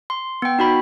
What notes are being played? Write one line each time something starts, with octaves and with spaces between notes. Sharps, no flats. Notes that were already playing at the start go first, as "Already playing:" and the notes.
C6
B3 G5
D#4 F#4 B5